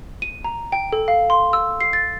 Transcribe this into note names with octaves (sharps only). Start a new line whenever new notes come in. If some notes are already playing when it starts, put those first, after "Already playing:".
D#7
A#5
G5
A4
F5
C6
E6
C7
A6